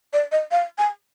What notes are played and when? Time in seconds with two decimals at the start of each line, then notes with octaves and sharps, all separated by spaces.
0.13 D5
0.32 D#5
0.51 F5
0.78 G#5